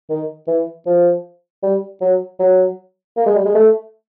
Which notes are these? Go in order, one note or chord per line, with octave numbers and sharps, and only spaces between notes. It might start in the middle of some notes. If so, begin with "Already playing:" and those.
D#3
E3
F3
G3
F#3
F#3
A#3
G#3
G3
G#3
A3